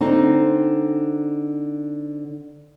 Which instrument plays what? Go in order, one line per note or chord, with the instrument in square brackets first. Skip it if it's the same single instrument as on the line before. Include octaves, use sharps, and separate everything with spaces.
[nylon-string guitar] D3 C4 D#4